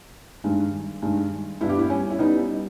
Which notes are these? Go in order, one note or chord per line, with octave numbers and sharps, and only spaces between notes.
G2 D#3 G#3
G2 D#3 G#3
G2 G3 B3 E4
G4
E4
C#4
E4
G3 B3 D#4